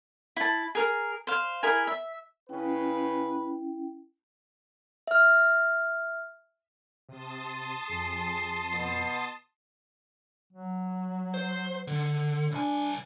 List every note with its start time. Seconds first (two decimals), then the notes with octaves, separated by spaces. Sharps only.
0.36 E4 A5
0.75 G#4 A#4
1.27 C5 F5
1.63 E4 G#4 A#4 G#5
1.87 E5
2.49 C#3 C#4 E4 B4 G5
5.07 E5 F6
7.09 C3 A5 C6 D#6
7.89 F2 G#4 C7
8.73 B2
10.52 F#3
11.34 C5
11.87 D3
12.52 C2 D4 G#5